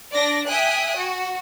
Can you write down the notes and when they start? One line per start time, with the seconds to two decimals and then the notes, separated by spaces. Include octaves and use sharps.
0.13 D4 D5 A#6
0.47 E5 G5 G#5 D#6 F#6
0.97 F#4